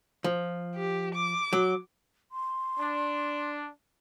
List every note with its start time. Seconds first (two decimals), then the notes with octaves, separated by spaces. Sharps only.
0.24 F3
0.76 G4
1.14 D6
1.53 F#3
2.32 C6
2.79 D4